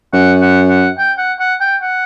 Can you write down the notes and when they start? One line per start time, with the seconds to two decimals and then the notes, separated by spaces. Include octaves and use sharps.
0.13 F#2 F#5
0.41 F#5
0.69 F#5
0.98 G5
1.18 F#5
1.39 F#5
1.60 G5
1.81 F#5